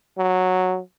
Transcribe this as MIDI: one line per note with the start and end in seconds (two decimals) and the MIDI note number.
0.18 0.80 54